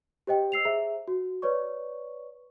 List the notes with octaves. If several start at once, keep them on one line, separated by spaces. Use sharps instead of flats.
G4 C5 D#5 G5
C5 E6 C7 F7
G#4 C5 E5 A#5
F#4
B4 C#5 D5 C#6